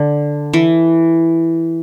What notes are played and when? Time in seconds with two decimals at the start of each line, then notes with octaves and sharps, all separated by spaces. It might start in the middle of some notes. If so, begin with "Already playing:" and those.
Already playing: D3
0.53 E3